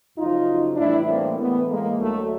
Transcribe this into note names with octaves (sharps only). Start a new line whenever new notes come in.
F#2 C#3 F3 D#4 F4
A2 E3 G3 D4 E4
A#3 C4
A2 E3 G#3 A3 B3
G#3 A#3
D2 D3 F#3 A3